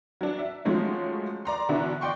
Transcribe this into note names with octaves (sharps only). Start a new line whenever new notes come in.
F#3 D4
E5
F3 F#3 G#3 A3 C#4
D5 A#5 C6
B2 D3 E3 D4 E4
D5 D#5 G5 C6 C#6